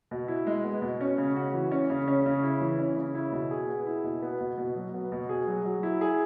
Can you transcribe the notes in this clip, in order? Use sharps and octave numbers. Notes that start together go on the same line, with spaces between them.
B2
E4
G#3
B3
B2
C#4
C#3
F#4
E3
C#4
C#3
C#4
C#3
E4
E3
C#4
C#3
E4
B2
G#4
B3
E4
B2
B3
B2
B2
F#3
B3
B2
G#4
F#3
F#3
E4
G#4